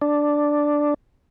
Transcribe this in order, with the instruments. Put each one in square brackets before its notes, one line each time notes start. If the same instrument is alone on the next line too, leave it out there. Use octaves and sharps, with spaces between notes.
[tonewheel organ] D4